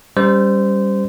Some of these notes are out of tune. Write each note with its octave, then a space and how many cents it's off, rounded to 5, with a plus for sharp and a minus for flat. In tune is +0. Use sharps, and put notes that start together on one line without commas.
G3 +10 C#4 +0 C5 -20